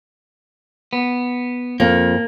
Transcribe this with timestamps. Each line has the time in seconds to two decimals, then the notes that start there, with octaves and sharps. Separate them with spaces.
0.93 B3
1.80 F2 A#3